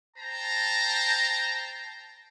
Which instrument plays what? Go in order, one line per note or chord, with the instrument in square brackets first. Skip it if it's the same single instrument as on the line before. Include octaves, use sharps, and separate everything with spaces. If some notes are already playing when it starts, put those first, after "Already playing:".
[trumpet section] C5 G5 A5 A#5